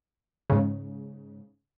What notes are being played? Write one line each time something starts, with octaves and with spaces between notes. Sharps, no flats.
G#2 C#3